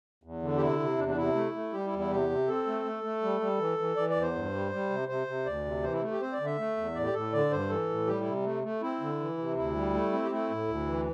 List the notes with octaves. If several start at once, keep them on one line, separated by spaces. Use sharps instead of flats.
E2
D3
G4
C3 E4
C3
E2 D4
D4
C3 E4
A3
A3
G3 G4
E4
E2
E4
C3 G4
C3
C4 A4
A3
A3
A3
G3
G3
E3
E3
E3 D5
D5
E2
C5
G2
G3
G3
C3
C3 C5
C3
D2 D5
C3
E3 C5
E4
A3
G4
C4 C5
D5
D3
E5
A3
E2
A2 D5
G4
A2 A4
D3 D5
G2 C5
E3 A4
A2
G3 G4
E4
C3
A3
A3
C4 E4
D3
E3
C3
D2 E4
G3
A3
C4
G4
A3 E4
A2
D2
E3